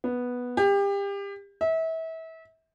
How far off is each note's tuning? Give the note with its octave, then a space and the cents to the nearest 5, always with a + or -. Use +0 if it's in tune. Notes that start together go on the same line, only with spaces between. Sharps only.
B3 -5
G4 +30
E5 -30